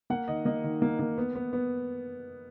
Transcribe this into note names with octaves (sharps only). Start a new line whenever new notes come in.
A#3 F#5
D#3 D#5
A#3 D#5
D#3
A#3
A#3
B3
B3
B3